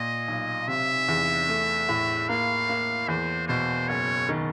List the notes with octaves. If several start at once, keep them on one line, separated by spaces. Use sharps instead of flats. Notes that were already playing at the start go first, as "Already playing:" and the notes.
Already playing: A#2 D#5
B1
C3 E5
E2
A3
A2
A#3 F5
A#3
E2 C5
B2 C5
F#1 C#5
D#3